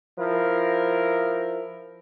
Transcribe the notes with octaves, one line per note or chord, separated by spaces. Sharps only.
F3 E4 A#4